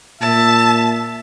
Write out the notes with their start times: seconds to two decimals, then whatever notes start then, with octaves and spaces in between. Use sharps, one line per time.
0.21 A#2 E5 A5